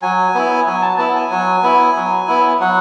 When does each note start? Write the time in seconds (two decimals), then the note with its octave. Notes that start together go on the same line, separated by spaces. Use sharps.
0.02 F#3 G#5
0.35 B3 E4
0.66 F#3 G#5
0.82 A5
0.98 B3 E4 A5
1.15 G#5
1.30 F#3
1.63 B3 E4
1.96 F#3
2.28 B3 E4
2.60 F#3 F#5